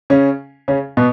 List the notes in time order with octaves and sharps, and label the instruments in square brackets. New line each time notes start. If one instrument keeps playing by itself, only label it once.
[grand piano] C#3 C#4
C#3 C#4
B2 B3